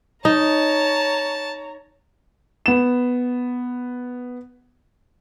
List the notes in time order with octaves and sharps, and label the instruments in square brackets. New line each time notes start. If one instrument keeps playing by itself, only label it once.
[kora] D#4 [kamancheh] C#5 A#5 [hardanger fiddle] A5
[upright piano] B3 E7